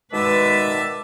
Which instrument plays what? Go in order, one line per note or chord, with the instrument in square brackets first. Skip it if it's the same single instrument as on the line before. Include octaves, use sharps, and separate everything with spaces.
[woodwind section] B2 D#3 G#3 [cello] B4 [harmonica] D5 E5 A5